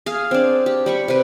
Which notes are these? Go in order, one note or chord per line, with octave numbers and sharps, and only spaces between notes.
G#4 F5
C4 D4
G4
G3 B5 C#6
C3 B4